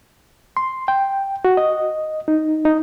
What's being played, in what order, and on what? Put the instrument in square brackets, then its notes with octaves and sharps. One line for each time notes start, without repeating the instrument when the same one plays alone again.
[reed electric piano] C6
G5
F#4
D#5
D#4
D#4